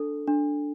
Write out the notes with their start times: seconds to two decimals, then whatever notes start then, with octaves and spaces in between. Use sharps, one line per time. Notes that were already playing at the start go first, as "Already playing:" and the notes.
Already playing: D4 A4
0.27 D4